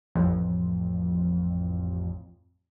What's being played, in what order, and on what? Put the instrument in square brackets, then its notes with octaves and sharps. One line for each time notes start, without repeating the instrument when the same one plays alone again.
[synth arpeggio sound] A1 F2